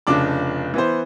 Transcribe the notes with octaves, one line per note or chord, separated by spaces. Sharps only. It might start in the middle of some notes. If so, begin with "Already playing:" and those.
F1 C#3 F3 D4 D6
E3 B3 C5